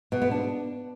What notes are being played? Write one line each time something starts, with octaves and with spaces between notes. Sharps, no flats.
B2
B3
D4